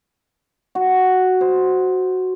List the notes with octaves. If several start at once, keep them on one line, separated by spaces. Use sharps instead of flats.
F#4
C5